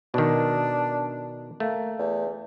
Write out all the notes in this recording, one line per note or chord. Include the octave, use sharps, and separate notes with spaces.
B2 D#3 D4
A3 A#3
E2